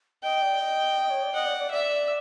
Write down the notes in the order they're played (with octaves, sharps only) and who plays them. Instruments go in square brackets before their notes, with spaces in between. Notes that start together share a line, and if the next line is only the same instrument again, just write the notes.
[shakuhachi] D#5 [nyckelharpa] G5
[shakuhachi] D5
D#5
C#5
D5
[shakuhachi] D#5 [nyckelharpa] F#5
[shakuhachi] D5
D5
[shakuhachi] D5 [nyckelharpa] E5